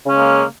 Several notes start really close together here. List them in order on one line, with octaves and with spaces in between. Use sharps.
C#3 C#4 G#3 A#3